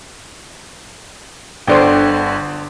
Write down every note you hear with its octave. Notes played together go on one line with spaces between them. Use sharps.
G1 D3 C5 D5 G5